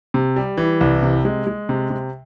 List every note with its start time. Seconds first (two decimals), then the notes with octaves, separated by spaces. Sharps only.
0.14 C3
0.36 G3
0.57 E3
0.81 C2
1.03 C3
1.25 G#3
1.47 G#3
1.69 C3
1.90 C3